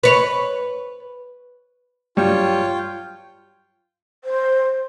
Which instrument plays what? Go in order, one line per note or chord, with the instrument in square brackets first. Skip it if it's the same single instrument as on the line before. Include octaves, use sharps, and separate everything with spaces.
[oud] B4 C#5
[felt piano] G2 F#3 [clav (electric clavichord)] G3 [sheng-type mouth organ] F4 G5 [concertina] C#5
[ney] C5